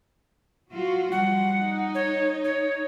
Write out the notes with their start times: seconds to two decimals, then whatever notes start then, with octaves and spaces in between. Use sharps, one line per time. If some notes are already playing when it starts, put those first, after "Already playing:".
0.70 F#3 F4 F#4
1.12 F3 G3 F#5
1.60 D#4
1.95 C#5
2.44 C#5